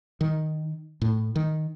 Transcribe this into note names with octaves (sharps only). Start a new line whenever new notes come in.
D#3
A2
D#3